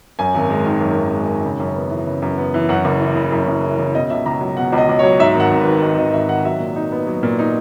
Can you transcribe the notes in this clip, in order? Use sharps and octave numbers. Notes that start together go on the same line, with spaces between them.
F#2 G#5
G#1
G#3
D#3
F#2
G#1
G#3
D#3
C#3
F#2
B3
E3
C#3
F#2
B3
E3
F#2 F#5
F#1
E3
C#3
F#2
F#1
E3
C#3
B2 D#5
C#2 E5
C#2 A#5
F#3
B2 F#5
C#2
D#5
C#2
C#5
F#3
G#2 E5
G#1 F#5
G#1
B4
D#3
G#2 D#5
G#1 D#5
G#1 E5
D#3 F#5
F#3 E5
A#2
D#4
B3
F#3
A#2
D#4